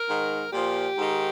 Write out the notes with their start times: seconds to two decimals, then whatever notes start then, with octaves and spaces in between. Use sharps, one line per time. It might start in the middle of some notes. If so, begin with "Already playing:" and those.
Already playing: A#4
0.09 G#2 D#3
0.53 A#2 F3 G4
0.97 G#2 D#3